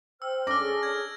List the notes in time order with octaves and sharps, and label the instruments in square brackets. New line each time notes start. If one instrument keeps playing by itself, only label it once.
[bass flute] C5 [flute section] G5 F6 [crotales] E6
[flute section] C#4 D4 A4 [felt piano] D6 [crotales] F6 A#6
[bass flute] G#4
[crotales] G#6